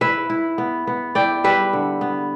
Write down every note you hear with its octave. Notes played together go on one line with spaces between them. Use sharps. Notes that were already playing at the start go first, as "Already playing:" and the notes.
E4 B4 E5
E4
B3
B3
E4 D5 G5
G3 B4 E5
D3
B3